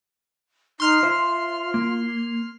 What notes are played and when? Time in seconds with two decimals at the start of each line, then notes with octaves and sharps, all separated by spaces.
0.80 D#4 C6 F6 C7
1.03 F4 C5 E5
1.74 A#3